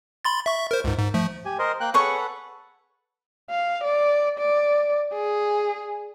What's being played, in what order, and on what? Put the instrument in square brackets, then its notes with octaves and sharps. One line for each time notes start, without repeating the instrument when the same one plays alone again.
[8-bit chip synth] B5 C6 A6
E5 C#6
A#4 C5
C#2 G#2
G#2
F3 A3
[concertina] G4 G#5
A#4 C5 D#5
A#3 G5 F#6
[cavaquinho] G#4 C#5 C#6 [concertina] A4 B4 F#5
[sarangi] F5
D5
D5
G#4